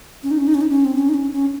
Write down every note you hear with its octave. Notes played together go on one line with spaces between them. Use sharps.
C#4
D#4
C#4
D#4
C#4
D#4
C#4
C4
C#4
D#4
C#4
C#4